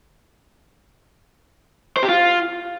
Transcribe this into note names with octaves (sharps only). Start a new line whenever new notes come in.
C5
G4
F4